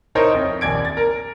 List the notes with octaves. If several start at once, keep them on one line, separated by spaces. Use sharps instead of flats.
D#4 E4 A#4 C5 C#5 D#5
F2
A#1 D#2 D5 G#6 D7
A6
A#4